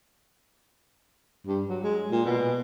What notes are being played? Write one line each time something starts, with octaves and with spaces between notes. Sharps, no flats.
G2
F#3
G#3
A#2
B2